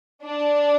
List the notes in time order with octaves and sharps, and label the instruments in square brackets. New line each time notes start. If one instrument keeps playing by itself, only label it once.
[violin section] D4